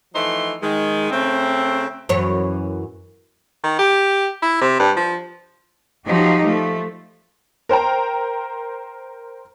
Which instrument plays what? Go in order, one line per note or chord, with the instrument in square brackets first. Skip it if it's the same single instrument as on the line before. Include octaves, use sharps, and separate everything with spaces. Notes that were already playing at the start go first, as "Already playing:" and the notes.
[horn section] E3 F3 A3 D#4 C6
D#3 G#3
C#3 A3 C4
[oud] F#2 E3 C#5
[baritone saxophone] D#3
G4
E4
C3
G2
F3
[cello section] F3 F#3 D#4 G4
F3 A3
[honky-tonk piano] A#4 C5 G5 A#5